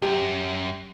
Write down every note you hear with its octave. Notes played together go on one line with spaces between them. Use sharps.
C#2 F#2 G4